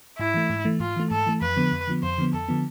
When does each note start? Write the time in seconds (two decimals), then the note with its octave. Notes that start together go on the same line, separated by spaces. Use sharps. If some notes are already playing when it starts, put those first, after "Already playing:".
0.19 G#2 E4
0.34 E3 A3
0.50 G#2
0.65 E3 A3
0.80 G#2 F4
0.96 E3 A3
1.11 G#2 A4
1.26 E3 A3
1.42 F2 B4
1.56 D3 F3 B3
1.72 F2
1.87 D3 F3 B3
2.03 F2 C5
2.18 D3 F3 B3
2.33 F2 A4
2.48 D3 F3 B3